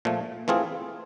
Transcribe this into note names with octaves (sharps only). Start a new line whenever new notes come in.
A#2 F3 A3
E3 A3 C4 F4 G#4